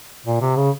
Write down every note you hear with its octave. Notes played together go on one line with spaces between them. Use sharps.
A#2
C3
C#3